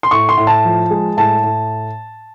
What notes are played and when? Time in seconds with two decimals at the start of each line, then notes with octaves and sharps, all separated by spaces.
0.03 C6
0.11 A2 C#6
0.29 C6
0.37 A2
0.47 A5
0.65 F3
0.90 G#3
1.17 A2 A5
1.43 A2